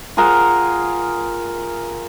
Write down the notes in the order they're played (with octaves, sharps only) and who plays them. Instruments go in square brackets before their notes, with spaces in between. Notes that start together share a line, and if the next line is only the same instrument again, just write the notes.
[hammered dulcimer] F4 G#4 A#4 F#5